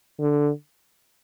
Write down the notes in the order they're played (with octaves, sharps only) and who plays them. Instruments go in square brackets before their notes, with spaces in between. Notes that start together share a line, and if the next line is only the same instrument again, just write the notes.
[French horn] D3